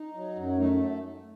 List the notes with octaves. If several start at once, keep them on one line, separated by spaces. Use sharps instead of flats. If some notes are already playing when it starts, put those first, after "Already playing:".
Already playing: D#4
F#3
F#2
A3 D#4